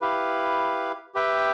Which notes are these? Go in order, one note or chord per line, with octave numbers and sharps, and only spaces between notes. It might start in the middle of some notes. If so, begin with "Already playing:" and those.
E4 G4 B4 F5
G4 B4 E5 G5